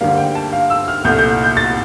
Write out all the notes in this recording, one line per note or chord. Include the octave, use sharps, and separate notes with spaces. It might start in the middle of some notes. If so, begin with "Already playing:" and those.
D2 D3 G3 A#3 F5
G5
A5
F5
E6
F6
C2 A#2 A3 G6
G6
G6
A6